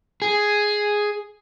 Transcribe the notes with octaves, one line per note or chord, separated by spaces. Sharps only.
G#4